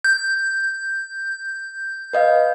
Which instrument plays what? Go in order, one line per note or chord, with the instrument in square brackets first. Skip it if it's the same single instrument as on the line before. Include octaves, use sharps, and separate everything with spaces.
[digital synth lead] G6
[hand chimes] B4 D#5 F5